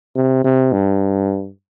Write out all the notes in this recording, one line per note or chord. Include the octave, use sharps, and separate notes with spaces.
C3
C3
G2